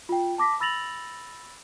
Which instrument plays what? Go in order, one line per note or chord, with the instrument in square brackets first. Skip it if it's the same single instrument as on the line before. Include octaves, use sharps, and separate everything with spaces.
[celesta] F4 G5
A5 D6 A#6 B6
B5 E6 A6 A#6 F7 F#7